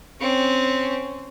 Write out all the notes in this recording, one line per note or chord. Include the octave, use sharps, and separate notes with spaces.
C4 C#4